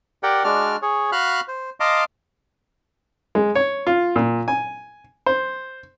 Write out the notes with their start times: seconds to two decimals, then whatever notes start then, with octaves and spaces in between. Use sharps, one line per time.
0.23 G4 A#4 D5 F#5 G5
0.44 G#3 D4 F#4 D5 F6
0.82 G#4 C#5
1.12 F#4 F5 B5 F6 F#6
1.48 C5
1.80 D#5 F5 A5 A#5 C6 D6
3.35 G#3
3.55 C#5
3.87 F4
4.16 A#2
4.48 G#5
5.26 C5